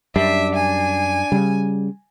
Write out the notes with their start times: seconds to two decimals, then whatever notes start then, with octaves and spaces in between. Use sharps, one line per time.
0.16 F#2 G3 D4 E5
0.55 G#5
1.32 C#3 G3